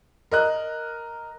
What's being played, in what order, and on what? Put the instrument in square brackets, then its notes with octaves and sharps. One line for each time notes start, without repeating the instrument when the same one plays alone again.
[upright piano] A#4 D#5 F#6